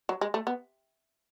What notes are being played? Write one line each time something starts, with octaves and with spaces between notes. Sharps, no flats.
F#3
G#3
A3
B3